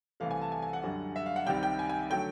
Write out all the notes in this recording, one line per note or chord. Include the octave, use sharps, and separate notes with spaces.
C2 C3 E3 A3 F5
G#5
A5
G#5
G#5
F#5
F#2 D3 G3
E5
F5
F#5
C2 C3 D#3 G3 G5
G5
G#5
G#5
D3 F#3 A3 G5